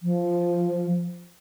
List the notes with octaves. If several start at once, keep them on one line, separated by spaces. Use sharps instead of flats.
F3